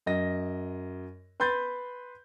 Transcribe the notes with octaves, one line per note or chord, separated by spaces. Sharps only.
F#2 D#5 A#6
B4 B5 C6 G6 A6